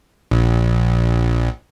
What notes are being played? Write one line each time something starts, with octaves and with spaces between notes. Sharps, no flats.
A#1